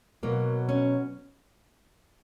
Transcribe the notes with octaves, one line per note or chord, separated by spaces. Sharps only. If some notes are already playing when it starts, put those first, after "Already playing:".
B2 F#3 A#3
C#4